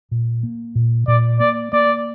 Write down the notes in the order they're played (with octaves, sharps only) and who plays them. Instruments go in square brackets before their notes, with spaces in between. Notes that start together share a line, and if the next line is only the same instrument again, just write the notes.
[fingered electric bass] A#2
A#3
A#2
[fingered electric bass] A#2 [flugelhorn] D5
[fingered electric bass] A#3 [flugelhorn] D5
[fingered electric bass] A#3 [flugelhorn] D5